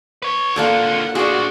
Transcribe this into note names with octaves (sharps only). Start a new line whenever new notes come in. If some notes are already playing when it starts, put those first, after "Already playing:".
B4 C#5
D3 A#3 F4 A4 D5 F#5
D4 F4 F#4 G#4 D5